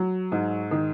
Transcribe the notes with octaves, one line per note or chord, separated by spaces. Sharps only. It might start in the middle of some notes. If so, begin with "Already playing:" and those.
Already playing: F#3
G#2
D#3